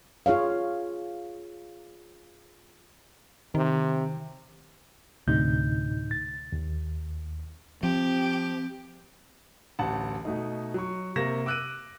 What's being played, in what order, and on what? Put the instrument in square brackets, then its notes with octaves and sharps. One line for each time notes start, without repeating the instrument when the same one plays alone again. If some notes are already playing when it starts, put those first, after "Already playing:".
[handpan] F4 G#4 C#5 F5
[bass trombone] C3 [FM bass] D#3
[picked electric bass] D2 C3 [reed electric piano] A2 D#4 G6
[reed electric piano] A6
D#2
[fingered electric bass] F3 [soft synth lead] C4 [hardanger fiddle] G4
[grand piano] D1 A1 F#5 A5
B2 A3 D#4
F#3 C#6
C3 A#3 C#6 A#6 E7
D6 E6 F#6 D7 D#7